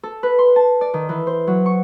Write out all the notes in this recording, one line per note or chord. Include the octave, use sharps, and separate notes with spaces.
A4
B4
C6
A5
D5
D#3
E3
C5
F#3
C#6